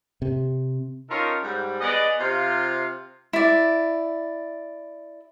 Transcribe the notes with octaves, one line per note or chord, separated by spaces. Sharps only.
C3
C#4 D#4 F4 A4 A#4
G#2 G3
B3 G#4 D5 D#5
C3 F4
E4 D5